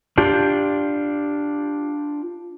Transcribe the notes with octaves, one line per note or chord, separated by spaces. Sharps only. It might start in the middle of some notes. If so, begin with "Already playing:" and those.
D4 F4 G4